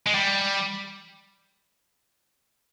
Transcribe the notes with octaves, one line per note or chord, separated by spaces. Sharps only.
G#3
G3